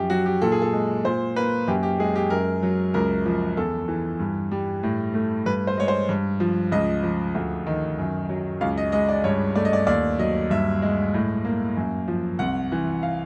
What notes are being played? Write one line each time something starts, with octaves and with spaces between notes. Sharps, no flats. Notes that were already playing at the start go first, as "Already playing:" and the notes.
Already playing: F#2 F3 G4
F#3 F#4
G4
A#2 A4
G#4
A4
G#3
A#2 C5
A#3 B4
F#2 G4
G4
G#3 G#4
G4
F#2 A#4
F#3
C#2 A#4
F3
E2 A4
E3
G2
G3
A2
A3
G2 B4
C5
G#3 C#5
C5
G2
F3
C#2 D#5
F3
D2
D#3
F#2
F#3
C#2 F5
D#5
G#3 D#5
D5
G2 C#5
A3 D5
D#5
D5
D#2 D5
F#3 D#5
G2 E5
G#3
A2
A#3
F#2
F3
C2 F#5
E3
F5